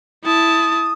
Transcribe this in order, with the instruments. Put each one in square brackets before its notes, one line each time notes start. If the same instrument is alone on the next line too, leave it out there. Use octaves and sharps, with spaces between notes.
[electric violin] E4 A5 [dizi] D#6